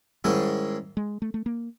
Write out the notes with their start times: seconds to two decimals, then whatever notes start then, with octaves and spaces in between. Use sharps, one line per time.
0.24 G#2 D#3 G3 G#3 C#4 E4
0.97 G#3
1.22 A3
1.34 A3
1.46 A#3